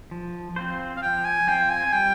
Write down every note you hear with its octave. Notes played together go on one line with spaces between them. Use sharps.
F3
C4 F4 C5
F5
F3 G5
G#5
C4 F4 C5 G5
G#5
G3 G5